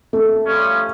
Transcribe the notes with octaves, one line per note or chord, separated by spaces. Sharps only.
A3
F3 G3 C#4